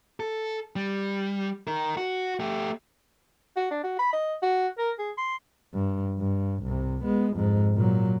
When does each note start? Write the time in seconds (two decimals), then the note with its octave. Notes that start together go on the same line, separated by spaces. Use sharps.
0.20 A4
0.76 G3
1.67 D#4 A#4
1.97 F#4
2.40 A3 G4
3.56 F#4
3.71 D4
3.83 F#4
3.99 B5
4.13 D#5
4.43 F#4
4.78 A#4
4.99 G#4
5.17 C6
5.74 G2
6.19 G2
6.63 C2 C3
7.04 G#3 B3
7.35 F2 G#2
7.75 A#2 F#3